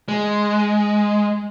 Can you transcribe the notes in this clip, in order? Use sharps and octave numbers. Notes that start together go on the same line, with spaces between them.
G#3